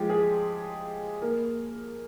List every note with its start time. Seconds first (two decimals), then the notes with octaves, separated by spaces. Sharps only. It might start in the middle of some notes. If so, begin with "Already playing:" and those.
Already playing: F3 G#3 G4
0.09 G#4
1.22 A#3